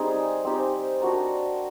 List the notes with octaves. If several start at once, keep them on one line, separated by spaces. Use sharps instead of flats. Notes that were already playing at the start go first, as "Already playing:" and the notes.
Already playing: G3 C4 D#4 G#4
C4 D#4 G4
D4 F#4 A#4